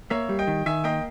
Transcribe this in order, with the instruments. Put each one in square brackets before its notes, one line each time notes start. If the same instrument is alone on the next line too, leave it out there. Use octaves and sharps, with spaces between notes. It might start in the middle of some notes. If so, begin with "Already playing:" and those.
[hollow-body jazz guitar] A#3 [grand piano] C#5 E5
[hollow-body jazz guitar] G3
[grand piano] D#5 G5
[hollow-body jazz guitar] D#3
[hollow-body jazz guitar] D#3 [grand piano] E5 G#5
[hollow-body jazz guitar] A#3 [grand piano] D#5 G5